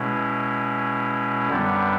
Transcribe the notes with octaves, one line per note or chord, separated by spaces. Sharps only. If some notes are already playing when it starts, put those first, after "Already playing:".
Already playing: B2 G#3 C#4 E4
F#2 D3 G3 B3 D4